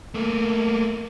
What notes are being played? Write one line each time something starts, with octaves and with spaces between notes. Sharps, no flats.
A3 A#3